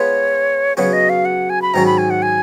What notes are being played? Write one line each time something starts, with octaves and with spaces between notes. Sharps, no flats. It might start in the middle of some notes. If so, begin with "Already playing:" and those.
Already playing: G#3 B3 F4 B4 C#5
C#3 F#3 B3 F#4 C#5
D#5
F5
F#5
G#5
B5
G#2 D#3 F#3 C#4 A#5
B5
G#5
F#5
G#5